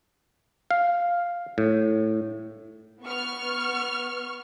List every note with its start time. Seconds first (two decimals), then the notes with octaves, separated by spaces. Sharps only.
0.71 F5
1.58 A2
3.03 B3 C#6 F6